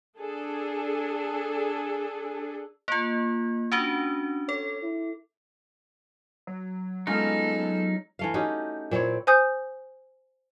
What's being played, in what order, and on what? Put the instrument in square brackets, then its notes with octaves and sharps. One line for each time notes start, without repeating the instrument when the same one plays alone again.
[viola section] D4 G#4 A4
[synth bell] A#3 F4
C#4 D4 F#4
[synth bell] A4 [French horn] C#5
[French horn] E4
[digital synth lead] F#3
[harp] G#3 C#4 F4 [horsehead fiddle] B3 A4 [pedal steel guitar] D#4
[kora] E3 A3 F5
C#4 D#4 F#4 G4
A#2 C4 E4 C#5
[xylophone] C5 G#5 D#6 G6